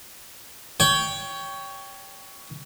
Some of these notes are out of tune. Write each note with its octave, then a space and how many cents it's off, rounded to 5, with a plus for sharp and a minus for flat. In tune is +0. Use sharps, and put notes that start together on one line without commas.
C#5 +15 G5 +0